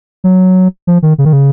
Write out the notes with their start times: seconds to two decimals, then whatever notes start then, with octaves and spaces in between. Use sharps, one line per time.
0.24 F#3
0.87 F3
1.02 D#3
1.18 C#3
1.25 D#3
1.33 C#3